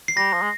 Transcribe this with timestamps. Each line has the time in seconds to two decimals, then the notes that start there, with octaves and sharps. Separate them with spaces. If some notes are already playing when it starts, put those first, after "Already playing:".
0.08 C7
0.17 G3 A#6
0.34 F3
0.42 G#3